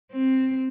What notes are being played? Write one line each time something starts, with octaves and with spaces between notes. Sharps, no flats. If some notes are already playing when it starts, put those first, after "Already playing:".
C4